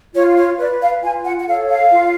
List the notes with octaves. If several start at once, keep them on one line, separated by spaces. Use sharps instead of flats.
F4 C#5
C#5
B4 D5
F5
F4 G#5
F#5
F#5
A4 C#5 F5
F5
F4